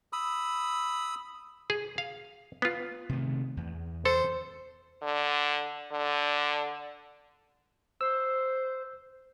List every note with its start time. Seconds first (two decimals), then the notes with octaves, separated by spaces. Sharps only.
0.13 B5 D#6 E6
1.70 G#4
1.98 F5
2.62 B3 F4
3.09 C3 D#3 A3
3.57 E2
4.05 A4 C5
5.02 D3
5.92 D3
8.01 C5 E6